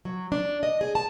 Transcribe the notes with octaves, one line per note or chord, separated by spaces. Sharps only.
F#3
D4
D#5
G#4
A5